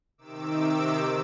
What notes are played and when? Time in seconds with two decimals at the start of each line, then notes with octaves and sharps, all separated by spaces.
0.18 C3 D#3 D6 E6